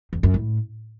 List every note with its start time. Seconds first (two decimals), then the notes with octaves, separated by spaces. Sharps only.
0.13 E2
0.23 F#2
0.34 A2